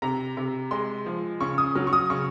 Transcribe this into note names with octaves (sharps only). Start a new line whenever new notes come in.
C3 A#5
C3
G#3 C6
F3
C#3 C#6
D#6
F#3 F6
C#6
D#6
C#3 C#6